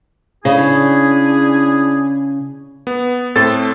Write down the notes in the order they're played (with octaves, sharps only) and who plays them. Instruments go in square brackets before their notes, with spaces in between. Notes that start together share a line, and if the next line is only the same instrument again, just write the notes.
[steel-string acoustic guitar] C#3 [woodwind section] D4 E4 G#4
[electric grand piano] B3
A2 C4 A4 A6